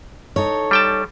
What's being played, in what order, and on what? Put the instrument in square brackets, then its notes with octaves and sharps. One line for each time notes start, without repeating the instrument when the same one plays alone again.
[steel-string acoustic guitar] D#4 A4 C#5
[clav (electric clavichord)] G3 G5 A5